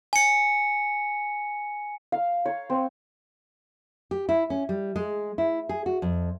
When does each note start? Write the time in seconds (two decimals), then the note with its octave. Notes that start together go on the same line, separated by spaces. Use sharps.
0.13 G#5 C#7
2.12 F5
2.46 C#5
2.70 C4
4.11 G4
4.29 E4
4.50 C#4
4.69 G3
4.96 G#3
5.38 E4
5.69 G#4
5.86 F#4
6.02 F2